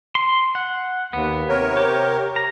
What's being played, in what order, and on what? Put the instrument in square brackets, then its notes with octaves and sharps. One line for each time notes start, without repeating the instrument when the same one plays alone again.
[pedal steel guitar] C6
F#5
[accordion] D#2 [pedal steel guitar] B3
[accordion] C3 A#4 C#5
[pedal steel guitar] G4
A#5